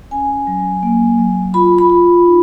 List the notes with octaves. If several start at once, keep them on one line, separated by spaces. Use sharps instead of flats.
C#4 G#5
F#3
A#3
F#3
F4 B5
B5
F4
D#4